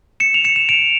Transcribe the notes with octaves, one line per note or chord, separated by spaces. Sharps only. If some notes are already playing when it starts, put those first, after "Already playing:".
C#7 E7
F7
C#7 E7
E7
D7 F7